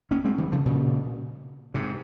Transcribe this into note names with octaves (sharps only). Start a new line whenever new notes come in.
A#3 C#4
G#3 C4
D#3 G3
C#3 F3
A#2 C#3
G#2 C3